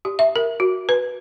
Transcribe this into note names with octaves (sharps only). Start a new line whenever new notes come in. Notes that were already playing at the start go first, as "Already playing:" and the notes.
G4
E5
A#4
F#4
B4